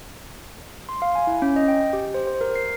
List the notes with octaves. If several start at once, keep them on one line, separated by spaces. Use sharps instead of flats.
C6
F5
G#5
E4
C#4
D#5
G5
G4
C5
C5
A#4
C7